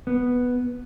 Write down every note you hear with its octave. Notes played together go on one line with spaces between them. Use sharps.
B3